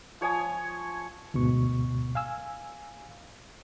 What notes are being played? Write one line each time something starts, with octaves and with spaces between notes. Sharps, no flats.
F3 C#5 G#5 D#6
D2 G#2 B2 C#6
F5 G#5 E6